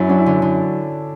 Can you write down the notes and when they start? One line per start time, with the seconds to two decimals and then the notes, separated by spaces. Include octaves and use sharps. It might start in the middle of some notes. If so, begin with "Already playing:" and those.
Already playing: F#2 E4
0.09 F#3 D4
0.18 E4
0.26 D3
0.42 D3 E4